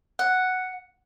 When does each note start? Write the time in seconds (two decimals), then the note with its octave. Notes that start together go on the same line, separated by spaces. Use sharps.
0.19 F#5